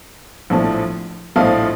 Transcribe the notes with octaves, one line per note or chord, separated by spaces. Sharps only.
A#1 A2 F3
A#1 A2 F3 D#5 F5